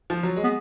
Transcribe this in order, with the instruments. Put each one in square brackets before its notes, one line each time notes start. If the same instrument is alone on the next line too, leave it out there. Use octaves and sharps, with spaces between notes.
[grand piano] F3
F#3
G#3
[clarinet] B3